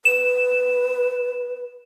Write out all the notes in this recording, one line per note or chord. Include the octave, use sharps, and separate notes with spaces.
B4 E7